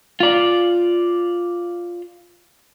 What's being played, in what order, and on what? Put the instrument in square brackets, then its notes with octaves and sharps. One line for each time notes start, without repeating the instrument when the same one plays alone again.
[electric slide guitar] F4 D5